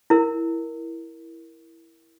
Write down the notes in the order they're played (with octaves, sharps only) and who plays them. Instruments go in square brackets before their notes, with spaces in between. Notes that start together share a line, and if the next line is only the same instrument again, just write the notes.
[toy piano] E4 A#4